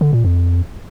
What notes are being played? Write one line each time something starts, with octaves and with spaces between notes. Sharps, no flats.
D3
A#2
F2